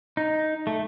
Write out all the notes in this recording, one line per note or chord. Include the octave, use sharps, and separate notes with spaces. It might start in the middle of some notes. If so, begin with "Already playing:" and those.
D#4
A3